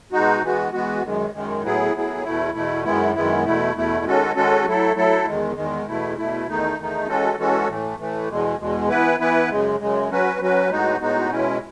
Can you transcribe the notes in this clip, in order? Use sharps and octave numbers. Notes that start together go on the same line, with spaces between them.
B2 G#3 D#4 F#4
E3 G#3 B3 F#4
E3 G#3 B3 F#4
F#2 D#3 G#3
F#2 D#3 G#3
A2 F#3 B3 E4 G#4
A2 F#3 B3 E4 G#4
E2 B2 A3 E4
E2 B2 A3 E4
F#2 D#3 G#3 B3 E4
F#2 D#3 G#3 B3 E4
E2 B2 A3 E4
E2 B2 A3 E4
D#3 G#3 C#4 F#4 A4
D#3 G#3 C#4 F#4 A4
F#3 A3 E4 A4
F#3 A3 E4 A4
E2 D#3 G#3
E2 D#3 G#3
E2 B2 A3 E4
E2 B2 A3 E4
E2 D#3 A3 D#4
E2 D#3 A3 D#4
E3 G#3 C#4 F#4 A4
E3 G#3 C#4 F#4 A4
A2 E3 A3
A2 E3 A3
E2 B2 G#3
E2 B2 G#3
E3 B3 E4 B4
E3 B3 E4 B4
F#2 C#3 G#3
F#2 C#3 G#3
F#3 C#4 F#4 B4
F#3 C#4 F#4 B4
A2 G#3 B3 D#4 F#4
A2 G#3 B3 D#4 F#4
B2 G#3 C#4 E4